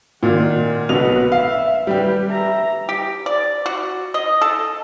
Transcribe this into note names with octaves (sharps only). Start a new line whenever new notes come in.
A#2 D#3 F4 F#5
B1 B2 B4 F#5 F7
E5 F5
G3 G4 B4
E5 A#5
G4
D5
F#4
D#5
A4